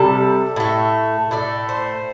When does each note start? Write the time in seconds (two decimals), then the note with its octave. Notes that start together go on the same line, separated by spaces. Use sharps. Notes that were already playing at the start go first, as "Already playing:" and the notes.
Already playing: C3 G3 A4
0.56 A2 A3
1.31 A2 A3 D5
1.69 C5